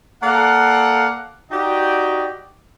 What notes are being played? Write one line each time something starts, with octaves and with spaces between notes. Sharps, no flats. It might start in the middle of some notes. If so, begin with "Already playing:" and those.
A#3 A4 D5 F5 F#5
D#4 F#4 G4 D5 D#5 G5